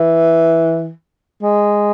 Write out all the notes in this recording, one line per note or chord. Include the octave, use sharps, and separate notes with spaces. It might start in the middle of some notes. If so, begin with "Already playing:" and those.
Already playing: E3
G#3